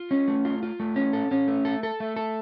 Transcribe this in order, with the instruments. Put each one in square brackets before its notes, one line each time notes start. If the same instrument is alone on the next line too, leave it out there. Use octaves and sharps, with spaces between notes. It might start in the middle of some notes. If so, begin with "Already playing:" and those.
Already playing: [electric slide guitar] F4
C#4
A3
F4
F4
A3
C#4
A4
C#4
A3
A4
A4
A3
A4